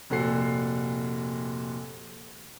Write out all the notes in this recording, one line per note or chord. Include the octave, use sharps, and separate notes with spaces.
F1 A#2 F#4 A4 C7